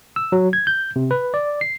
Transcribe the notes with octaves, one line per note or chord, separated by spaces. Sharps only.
E6
F#3
G#6
G6
C3
B4
D5
C7